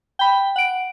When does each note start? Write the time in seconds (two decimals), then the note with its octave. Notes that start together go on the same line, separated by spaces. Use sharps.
0.19 G5 B5
0.56 F#5 D7